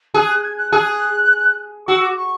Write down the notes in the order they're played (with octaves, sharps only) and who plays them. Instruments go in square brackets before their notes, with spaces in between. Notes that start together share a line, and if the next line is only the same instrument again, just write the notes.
[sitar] G#4 [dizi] F#6
[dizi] F#6
F#6
G#6
F#6
[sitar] G#4 [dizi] F#6
[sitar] F#4 [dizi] E6
[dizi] D6
C#6